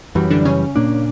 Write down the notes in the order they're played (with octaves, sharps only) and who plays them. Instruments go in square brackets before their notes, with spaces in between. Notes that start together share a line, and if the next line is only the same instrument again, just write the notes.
[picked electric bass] F#2 E3 G3 [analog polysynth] F#3
[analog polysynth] D3 D4
C#3 C#4
[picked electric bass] A#2 A#3 D4